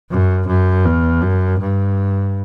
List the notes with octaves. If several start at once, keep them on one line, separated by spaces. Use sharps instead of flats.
F#2
F#2
E2
F#2
G2